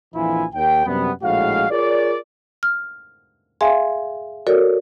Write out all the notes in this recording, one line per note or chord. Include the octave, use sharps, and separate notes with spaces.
A#1 F2 E3 E4 F4 G#5
D#2 G5
F#2 C3 G3 B3
A#1 A2 G#3 F#4 F5
F4 G#4 A#4 C#5 D5
F6
G#4 E5 F5 G#5 C6
F#4 A4 A#4 C#5 D5